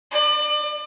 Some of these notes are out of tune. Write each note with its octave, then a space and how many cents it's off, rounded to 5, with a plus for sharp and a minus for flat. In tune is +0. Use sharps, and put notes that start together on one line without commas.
D5 +35